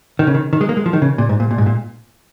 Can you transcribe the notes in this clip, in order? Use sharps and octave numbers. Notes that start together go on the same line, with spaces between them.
D#3
C#3
D#3
D#3
G#3
A#3
G#3
F3
D#3
C#3
A#2
G#2
A#2
A#2
G#2
A#2